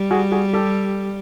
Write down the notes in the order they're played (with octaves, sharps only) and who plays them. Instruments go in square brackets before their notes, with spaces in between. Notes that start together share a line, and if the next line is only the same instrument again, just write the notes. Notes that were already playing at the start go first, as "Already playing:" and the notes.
Already playing: [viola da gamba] G3
[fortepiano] F#4 G#4
F#4 G#4
G4 A4